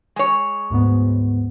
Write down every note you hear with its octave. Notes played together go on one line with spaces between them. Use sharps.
G#3 C#5
D2 G#2 B3